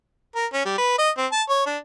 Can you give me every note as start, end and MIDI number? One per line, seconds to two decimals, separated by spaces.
0.35 0.46 70
0.53 0.65 61
0.66 0.73 55
0.78 0.94 71
0.98 1.10 75
1.17 1.26 60
1.32 1.42 81
1.49 1.66 73
1.66 1.77 62